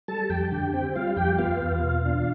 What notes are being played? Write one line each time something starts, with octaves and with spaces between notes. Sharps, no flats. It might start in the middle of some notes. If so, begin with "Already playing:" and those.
G3 A4 A5
F2 G4 G5
D3 G4 G5
C4 G4 G5
G3 F4 F5
F2 G4 G5
B3 F4 F5
E2
B2
D4